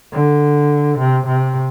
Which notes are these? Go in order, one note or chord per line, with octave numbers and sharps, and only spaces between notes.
D3
C3
C3